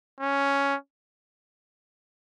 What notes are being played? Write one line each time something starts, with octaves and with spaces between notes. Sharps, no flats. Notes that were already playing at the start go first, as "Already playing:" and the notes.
C#4